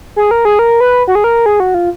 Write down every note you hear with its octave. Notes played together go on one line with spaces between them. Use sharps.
G#4
A#4
G#4
A#4
B4
F#4
G#4
A#4
G#4
F#4
F4